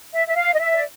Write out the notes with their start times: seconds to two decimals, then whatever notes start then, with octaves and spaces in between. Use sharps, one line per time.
0.14 E5
0.27 E5
0.36 F5
0.53 D#5
0.59 E5
0.75 D5